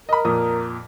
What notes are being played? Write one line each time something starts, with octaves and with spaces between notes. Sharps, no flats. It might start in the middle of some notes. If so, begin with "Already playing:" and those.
A#4 D#5 B5
F2 A#2 D#6